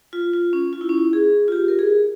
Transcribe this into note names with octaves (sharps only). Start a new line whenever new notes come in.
F4
F4
C#4
F4
E4
C#4
E4
G#4
F4
G4
A#4
G#4